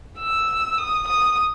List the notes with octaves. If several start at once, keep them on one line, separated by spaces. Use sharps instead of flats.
E6
D#6
D#6